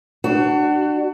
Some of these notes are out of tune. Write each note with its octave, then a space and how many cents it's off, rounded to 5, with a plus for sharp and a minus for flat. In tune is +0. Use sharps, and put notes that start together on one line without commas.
D4 +30 F#4 +20